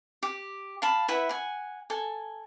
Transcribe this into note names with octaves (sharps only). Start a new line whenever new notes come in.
G4
F5 A5 B5
E4 B4 E5 F#5
F#5 G#5
A4 G#5